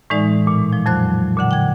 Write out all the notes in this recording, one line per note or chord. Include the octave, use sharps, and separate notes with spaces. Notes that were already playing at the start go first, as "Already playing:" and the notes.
A2 E3 G#3 D#4 D5
A#2
F3
F2 F#3 C5 F#6
A#2 D3 F#5
G5 G#6